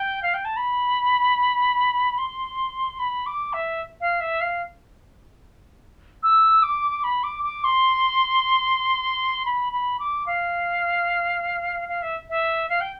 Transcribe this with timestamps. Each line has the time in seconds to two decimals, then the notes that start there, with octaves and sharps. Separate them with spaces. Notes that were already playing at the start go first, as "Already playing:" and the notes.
Already playing: G5
0.23 F5
0.34 G5
0.45 A5
0.57 B5
2.18 C6
2.99 B5
3.26 D6
3.53 E5
4.01 F5
4.20 E5
4.41 F5
6.23 E6
6.63 D6
7.04 B5
7.23 D6
7.44 D6
7.64 C6
9.46 B5
9.73 B5
10.00 D6
10.27 F5
11.89 F5
12.02 E5
12.30 E5
12.69 F5
12.81 G5